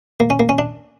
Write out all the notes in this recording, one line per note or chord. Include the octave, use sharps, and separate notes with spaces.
A#3
C#4
A#3
C#4
D4